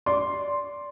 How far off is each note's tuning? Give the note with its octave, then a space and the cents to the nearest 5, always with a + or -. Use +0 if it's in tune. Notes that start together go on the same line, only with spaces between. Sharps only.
D5 -15 C6 +0